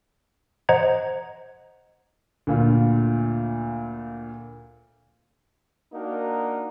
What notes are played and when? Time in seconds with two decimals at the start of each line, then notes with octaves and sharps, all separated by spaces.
0.69 C5 D#5 F#5 A#5 G#6
2.47 D2 A#2 F4
5.93 A#3 D4 D#4 F#4 A#4